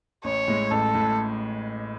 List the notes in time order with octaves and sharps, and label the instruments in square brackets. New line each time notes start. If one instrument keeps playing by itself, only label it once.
[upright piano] A1 [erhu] C#5
[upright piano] A2 G#3
[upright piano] A1 [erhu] A4
[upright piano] A2